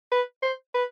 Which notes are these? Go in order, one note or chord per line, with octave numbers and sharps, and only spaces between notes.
B4
C5
B4